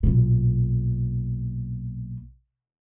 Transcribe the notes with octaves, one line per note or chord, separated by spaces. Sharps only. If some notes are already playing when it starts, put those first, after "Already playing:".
B1 A#2